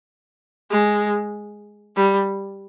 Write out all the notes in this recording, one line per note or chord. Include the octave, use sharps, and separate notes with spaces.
G#3
G3